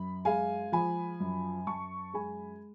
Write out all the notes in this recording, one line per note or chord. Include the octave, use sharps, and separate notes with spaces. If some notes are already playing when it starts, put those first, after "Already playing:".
Already playing: F#2 B5
G#3 F5 G#5
F3 G#5 B5
F#2
F#2 A5 C#6
G#3 G#5 B5